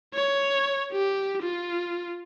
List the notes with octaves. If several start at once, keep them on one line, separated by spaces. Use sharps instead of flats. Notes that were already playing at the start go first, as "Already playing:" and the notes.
C#5
G4
F4